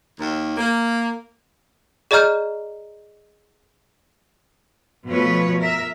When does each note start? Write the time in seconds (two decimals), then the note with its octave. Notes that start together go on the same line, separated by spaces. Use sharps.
0.19 D#2
0.57 A#3
2.11 G#4 D5 D#5 A#5 F6 G6
5.08 B2 F3 A3 B4 C#5
5.60 A#4 E5